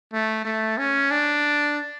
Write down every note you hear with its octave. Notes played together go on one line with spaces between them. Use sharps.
A3
A3
C#4
D4